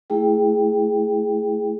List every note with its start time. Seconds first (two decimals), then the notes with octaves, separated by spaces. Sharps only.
0.10 A3 E4 G#4 G5